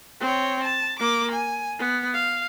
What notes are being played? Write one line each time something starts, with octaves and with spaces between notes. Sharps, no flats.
C4 C#5
A5
A#3 D6
G#5
B3
F5